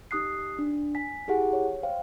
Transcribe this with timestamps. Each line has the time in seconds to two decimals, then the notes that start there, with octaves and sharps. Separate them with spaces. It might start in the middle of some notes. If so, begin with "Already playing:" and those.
0.11 D#4 G4 D#6 F#6 C7
0.59 D4
0.95 G#5 B6
1.28 E4 G4 G#4 F#5
1.53 C#5
1.83 C5 F5 G5